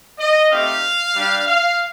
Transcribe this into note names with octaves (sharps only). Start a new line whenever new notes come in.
D#5
A3 C4 D#4 G4 F5
G3 D4 G4
F5